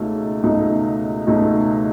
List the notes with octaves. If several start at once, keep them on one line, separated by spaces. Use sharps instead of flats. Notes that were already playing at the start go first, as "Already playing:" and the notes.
Already playing: C#2 B2 A3 D#4
C#2 B2 A3 D#4
C#2 B2 A3 D#4